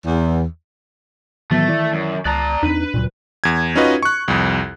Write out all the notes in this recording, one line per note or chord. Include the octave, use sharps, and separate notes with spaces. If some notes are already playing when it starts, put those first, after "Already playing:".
E2
A2 D#3 E3 F#3 A3 B3
E4 D5
F#2
C#2 D5 A5 A#5 D#6 F#6
E2 C4 D4 D#4 B4
D#1 C#2 A#2 F#3
E2 G#6
C#4 D#4 F4 F#4 B4 D#5
C#6 F#6
C2 F2